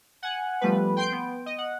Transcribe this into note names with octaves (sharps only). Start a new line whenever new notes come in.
F#5 G#5
F3 G3 A3 B3 B4
G5 C6 G6 D7
B3
D#5
F#5